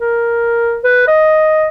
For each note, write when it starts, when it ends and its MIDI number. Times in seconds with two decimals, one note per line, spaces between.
0.01 0.78 70
0.84 1.05 71
1.07 1.68 75